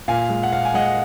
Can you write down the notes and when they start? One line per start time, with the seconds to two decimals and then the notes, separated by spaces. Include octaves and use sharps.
0.08 A#2 F5 G#5
0.29 G#3
0.43 F#5
0.52 A#2 F5
0.65 G#5
0.74 G#3 D#5 F#5